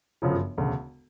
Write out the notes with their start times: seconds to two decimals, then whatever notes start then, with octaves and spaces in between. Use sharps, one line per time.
0.22 G1 F#2 C#3 F3
0.57 E1 D2 C#3